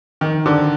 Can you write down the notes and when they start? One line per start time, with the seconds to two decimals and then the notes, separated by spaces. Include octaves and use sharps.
0.21 D#3
0.46 D3